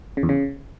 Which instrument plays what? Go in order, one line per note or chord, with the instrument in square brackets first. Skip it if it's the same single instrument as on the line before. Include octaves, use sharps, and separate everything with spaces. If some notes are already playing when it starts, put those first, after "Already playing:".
[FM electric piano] C#3
E2
C#3